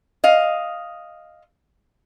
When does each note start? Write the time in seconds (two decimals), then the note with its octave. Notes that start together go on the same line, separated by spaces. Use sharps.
0.24 D#5 F5